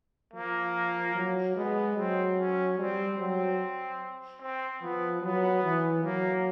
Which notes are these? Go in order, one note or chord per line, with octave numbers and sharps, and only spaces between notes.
F3 A#3
F#3
G#3 B3
F#3 C4
C#4
G3 C4
F#3 C4
C4
F3 B3
F#3 B3
E3
F#3 A#3